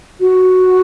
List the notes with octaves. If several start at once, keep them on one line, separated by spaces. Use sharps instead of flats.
F#4